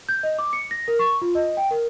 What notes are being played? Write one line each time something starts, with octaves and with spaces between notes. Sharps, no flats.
G6
D#5
D6
C#7
A#6
A#4
C#6
F4
D#5
G5
A#4